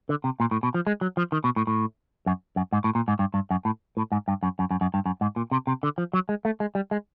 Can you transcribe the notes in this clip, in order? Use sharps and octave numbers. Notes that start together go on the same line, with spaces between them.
D3
C3
A#2
A2
B2
F3
G#3
F#3
F3
D#3
B2
A2
A2
F#2
F#2
G#2
A2
A#2
G#2
G2
G2
F#2
A2
A2
G#2
G2
F#2
F#2
F#2
F#2
G2
F#2
G#2
A#2
C3
C3
D3
F3
F#3
G#3
A3
G#3
G3
G#3